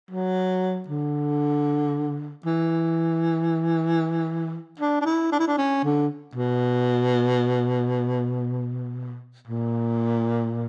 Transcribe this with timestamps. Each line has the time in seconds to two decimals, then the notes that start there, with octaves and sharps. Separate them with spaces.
0.11 F#3
0.88 D3
2.45 E3
4.80 D4
5.01 D4
5.05 E4
5.32 D4
5.39 E4
5.47 D4
5.57 C#4
5.84 D3
6.35 B2
9.47 A#2